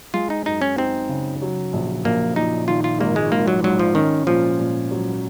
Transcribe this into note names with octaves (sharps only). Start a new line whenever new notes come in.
G#3 F4
D#4
F#2 D#4
C#4
C4 D#4
C#3
F#3
A#1
A#1 A#3
A#2 D#4
D#3 F4
F4
G#1 A#3
G#3
G#1 A#3
F#3
G#2 F#3
F3
D#3 C#4
A#2 F3
A#2
F#3